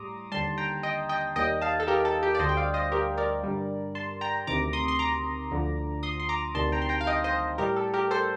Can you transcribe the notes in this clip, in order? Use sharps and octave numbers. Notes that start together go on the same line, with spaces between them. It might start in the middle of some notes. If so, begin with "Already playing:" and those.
Already playing: A2 G3 A#5 C6 D6 D#6
D#2 D3 G3 A5 C6
G5 A#5
D#5 G5
D#5 G5
D#2 D#3 G3 D#5 G5
F5 A5
A4
G4 A#4
A4
G4
D5
D2 D3 G3 C5 D#5
G5
D5 F5
C5 D#5
G4 A#4
A#4 D5
G2 D3 G3
A5 C6
G5 A#5
D2 C3 D#3 A#5 D6
C6 D#6
C6
A#5 D6
D2 D3 F3
C6 D#6
C6
A#5 D6
D2 C3 D#3 G3 A5 C6
G5 A#5
C6
G5 A#5
F5
D#5 G5
C5 D#5
A2 G3 G4 A#4
A4
G4 A#4
A4 C5